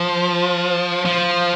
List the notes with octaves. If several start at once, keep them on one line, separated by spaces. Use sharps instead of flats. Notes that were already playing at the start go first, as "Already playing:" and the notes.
Already playing: F3
F3